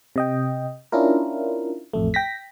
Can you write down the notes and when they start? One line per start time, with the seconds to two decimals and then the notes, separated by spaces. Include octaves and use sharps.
0.16 C3 D#5 G5
0.92 C#4 D4 E4 F4 A#4
1.93 A1 F2 A3
2.14 G5 A#6 B6